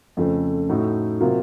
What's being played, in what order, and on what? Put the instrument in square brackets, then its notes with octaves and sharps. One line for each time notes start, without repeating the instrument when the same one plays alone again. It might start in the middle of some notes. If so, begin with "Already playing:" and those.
[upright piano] F2 C#3 F3 A3
A2 A3 D#4 F#4
C3 F#3 A#3 F4